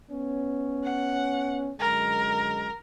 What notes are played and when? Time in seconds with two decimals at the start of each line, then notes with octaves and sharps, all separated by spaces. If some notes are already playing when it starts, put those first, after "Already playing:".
0.11 B3 C#4
0.84 F#5
1.80 F#2 D3 G#3 A#4